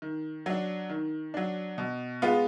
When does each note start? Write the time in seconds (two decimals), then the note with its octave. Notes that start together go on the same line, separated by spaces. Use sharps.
0.02 D#3
0.46 F#3 D4
0.90 D#3
1.34 F#3 D4
1.78 B2
2.22 G#3 B3 F4